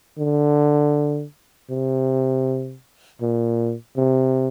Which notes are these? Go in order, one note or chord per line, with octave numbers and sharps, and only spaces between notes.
D3
C3
A#2
C3